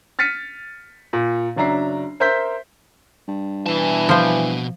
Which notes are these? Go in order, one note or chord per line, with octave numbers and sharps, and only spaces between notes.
F6 A6 B6 C#7 D#7
A#2
F#1 F#3 D4 E5 A#5 C7
A#4 C5 E5 G6 B6
G2
B2 E3 A5
F3 C5